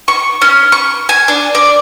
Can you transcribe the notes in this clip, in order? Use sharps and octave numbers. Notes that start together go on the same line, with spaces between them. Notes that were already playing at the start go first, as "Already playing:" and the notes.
C#6
C#4
C#6
G#5
D4
D5